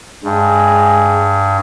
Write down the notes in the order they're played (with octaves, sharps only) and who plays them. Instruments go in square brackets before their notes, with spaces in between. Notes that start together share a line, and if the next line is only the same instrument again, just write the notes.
[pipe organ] G2 [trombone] G#3